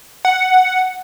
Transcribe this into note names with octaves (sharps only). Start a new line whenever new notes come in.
F#5